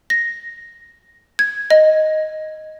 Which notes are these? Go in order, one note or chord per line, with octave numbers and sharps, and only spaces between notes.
A#6
G#6
D#5